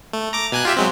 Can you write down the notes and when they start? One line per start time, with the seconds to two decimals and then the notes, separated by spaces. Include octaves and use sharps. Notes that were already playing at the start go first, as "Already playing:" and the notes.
0.13 A3
0.33 A#5 D6
0.52 B2 G#5 F#6
0.65 F4 G4 E5
0.77 F#3 G#3 C4